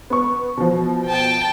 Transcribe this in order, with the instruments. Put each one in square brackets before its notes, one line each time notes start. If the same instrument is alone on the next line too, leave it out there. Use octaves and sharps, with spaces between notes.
[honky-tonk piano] B3 C#6
B2 F3
[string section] G5 A5